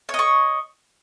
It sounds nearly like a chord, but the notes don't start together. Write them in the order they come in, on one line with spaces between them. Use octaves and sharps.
C#5 D#5 C#6